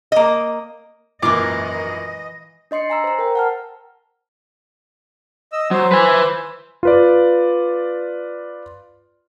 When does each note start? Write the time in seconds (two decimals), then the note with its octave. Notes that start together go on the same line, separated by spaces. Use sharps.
0.12 A#3 D#5
1.22 G#1 F#2 A#2 E3 F4 D#5 D6
2.71 D4 D#5 C6 C7 C#7
2.90 G#5 A#5 E6
3.04 C5 A#5
3.19 A#4 G5
3.35 F#5 A5 F6
5.53 D#5 E6
5.71 F#3 C5
5.92 B4 G#5
6.83 F4 B4 D5